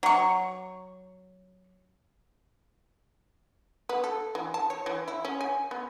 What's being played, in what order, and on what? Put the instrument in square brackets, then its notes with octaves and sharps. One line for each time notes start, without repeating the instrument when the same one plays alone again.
[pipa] F#3 C#6
[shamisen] B3
A4
E3
A5
C#5
E3
E4
C#4
G#5
B3